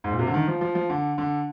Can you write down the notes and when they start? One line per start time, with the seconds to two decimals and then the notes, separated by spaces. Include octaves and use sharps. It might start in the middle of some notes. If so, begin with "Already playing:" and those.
0.04 G#2
0.11 A#2
0.19 C3
0.27 D3
0.34 D#3
0.47 F3
0.61 F3
0.75 F3
0.89 D3
1.18 D3